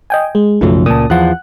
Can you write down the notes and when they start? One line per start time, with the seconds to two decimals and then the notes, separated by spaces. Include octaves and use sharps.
0.10 D#5 G5 G#5
0.35 G#3
0.61 B1 F#2 C#3 F3 A3
0.86 C#2 A#2 A5 D#6
1.10 E2 F3 F#5 F#6